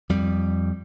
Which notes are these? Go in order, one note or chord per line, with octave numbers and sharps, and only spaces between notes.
F2 G3